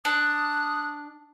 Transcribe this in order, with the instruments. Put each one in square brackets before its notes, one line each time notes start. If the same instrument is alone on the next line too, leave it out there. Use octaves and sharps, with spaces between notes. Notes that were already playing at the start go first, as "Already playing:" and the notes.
[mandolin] D4 [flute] D#6 [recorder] F#6